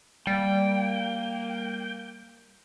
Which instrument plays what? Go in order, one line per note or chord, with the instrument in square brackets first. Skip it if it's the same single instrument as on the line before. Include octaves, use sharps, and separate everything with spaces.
[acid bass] G3 [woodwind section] A#3 [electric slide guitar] G5